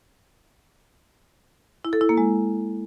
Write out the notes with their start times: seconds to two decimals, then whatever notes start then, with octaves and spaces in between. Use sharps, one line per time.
1.85 E4
1.93 A4
2.01 E4
2.09 A#3
2.18 G#3